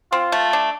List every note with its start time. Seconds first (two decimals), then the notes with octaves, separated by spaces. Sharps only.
0.12 C4 F4
0.32 A3
0.53 D4